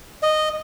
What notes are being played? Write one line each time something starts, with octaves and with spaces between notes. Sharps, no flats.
D#5